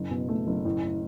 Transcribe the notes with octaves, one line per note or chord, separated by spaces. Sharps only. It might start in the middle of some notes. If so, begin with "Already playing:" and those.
Already playing: F#1
B2
A3
F#1
A2
A2